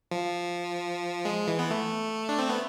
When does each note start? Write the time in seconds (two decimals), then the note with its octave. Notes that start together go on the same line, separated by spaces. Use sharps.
0.11 F3
1.25 G#3
1.47 E3
1.59 B3
1.71 A3
2.29 D4
2.39 C4
2.50 B3